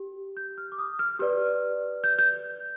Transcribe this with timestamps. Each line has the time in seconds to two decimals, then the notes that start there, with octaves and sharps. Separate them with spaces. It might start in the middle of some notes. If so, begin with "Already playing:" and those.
Already playing: G4
0.37 G6
0.58 F6
0.72 D6
0.79 D#6
0.99 F6
1.19 G4 B4 D5 F6
2.04 G6
2.19 G6